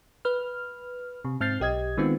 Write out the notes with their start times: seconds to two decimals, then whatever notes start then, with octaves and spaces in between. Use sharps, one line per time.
0.25 B4 F6
1.25 C3
1.40 G#2 C4 F6 G6 A6 C7
1.60 B1 G4 D#5 G#6
1.98 D#3 G#3 B3 C4 F4